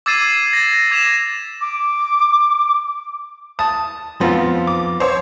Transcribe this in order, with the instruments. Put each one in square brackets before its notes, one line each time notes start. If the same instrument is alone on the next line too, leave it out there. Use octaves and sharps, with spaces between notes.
[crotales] D6 E6 G#6 A6 C7 D#7
G#6 A#6
D6 G#6 B6 E7 F7
[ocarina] D6
[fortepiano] A5 D#6
[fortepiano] F2 F4 [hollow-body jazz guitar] F3 B3
[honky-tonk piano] D6
C5 C#5